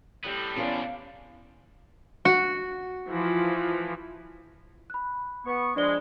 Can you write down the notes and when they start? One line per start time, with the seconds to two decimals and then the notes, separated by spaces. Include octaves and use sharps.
0.24 A2 G3 B3 C4
0.56 E2 A#2 C#4 D4 C5 F5
2.25 F#4
3.09 E3 F3
4.90 B5 F#6
5.46 B3 C#6
5.76 F3 G#3 D4 D5 G7